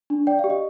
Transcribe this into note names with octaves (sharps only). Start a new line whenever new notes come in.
D4
D5 G5
G4 F5
D#5